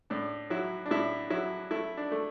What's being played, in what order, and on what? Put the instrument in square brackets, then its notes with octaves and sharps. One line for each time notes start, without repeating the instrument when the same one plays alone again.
[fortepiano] A2 D4
F#3 E4
D4
A2 E4
F#3 E4
A3 E4
D4
A3